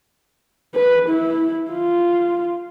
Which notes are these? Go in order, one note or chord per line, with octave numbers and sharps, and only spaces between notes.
B4
E4
F4